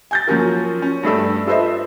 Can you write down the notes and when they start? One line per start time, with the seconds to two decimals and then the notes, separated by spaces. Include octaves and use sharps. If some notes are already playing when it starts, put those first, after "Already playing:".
0.11 G#5 G6 A6
0.28 F3 F#3 A#3 C#4 F#4 A#4
0.82 C#4
1.03 G2 G3 A3 D4 A4 D5
1.47 F4 A4 B4 C5 D#5 E5